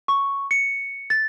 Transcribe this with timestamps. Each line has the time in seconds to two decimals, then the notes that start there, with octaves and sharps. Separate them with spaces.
0.08 C#6
0.51 C#7
1.10 A6